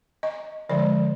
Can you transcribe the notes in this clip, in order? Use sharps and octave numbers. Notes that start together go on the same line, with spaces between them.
D#5
D3 F3 G#3 D5